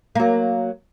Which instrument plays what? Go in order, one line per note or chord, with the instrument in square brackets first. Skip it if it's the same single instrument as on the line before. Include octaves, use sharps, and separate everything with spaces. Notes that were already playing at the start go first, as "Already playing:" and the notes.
[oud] F#3 A#3